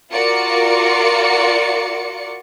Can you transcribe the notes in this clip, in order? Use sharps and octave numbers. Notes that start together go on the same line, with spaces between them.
F4 F#4 A#4 D5 C#7